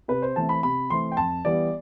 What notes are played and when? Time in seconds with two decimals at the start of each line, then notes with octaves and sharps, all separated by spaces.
0.08 C3 B4
0.22 C5
0.36 E3 A3 C4 A5
0.49 B5
0.63 C3 B5
0.90 E3 A3 C4 C6
1.12 G5
1.17 F2 A5
1.45 E3 G3 B3 D5